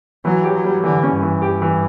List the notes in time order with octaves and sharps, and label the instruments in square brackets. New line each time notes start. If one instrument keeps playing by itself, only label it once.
[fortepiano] E3 [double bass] F#3
[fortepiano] G4
[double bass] F#3
[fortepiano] G3
[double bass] D3 [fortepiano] E3
[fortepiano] C#4
[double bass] G2
[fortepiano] E3
G4
E3